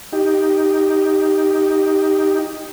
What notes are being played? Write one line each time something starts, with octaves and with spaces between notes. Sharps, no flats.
D#4 G4